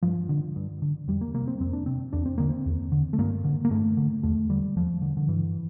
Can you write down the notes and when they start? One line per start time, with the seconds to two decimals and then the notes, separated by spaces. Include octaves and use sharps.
0.02 G2 F3
0.29 D3
0.56 G2
0.82 D3
1.08 F2 G3
1.21 A#3
1.34 C3 A#3
1.48 C4
1.60 F2 C4
1.73 D4
1.86 C3 C4
2.13 E2 D4
2.26 C4
2.38 D3 A#3
2.50 C4
2.66 E2
2.92 D3
3.13 A3
3.18 G2 A#3
3.44 D3
3.65 A#3
3.71 G2 A3
3.97 D3
4.23 E2 A3
4.49 D3 G3
4.76 E2 F3
5.02 D3
5.17 D3
5.28 G2 E3